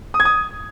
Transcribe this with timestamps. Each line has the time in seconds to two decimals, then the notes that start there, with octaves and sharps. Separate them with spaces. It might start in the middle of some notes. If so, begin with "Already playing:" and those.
0.14 D#6
0.20 G#6
0.25 D#6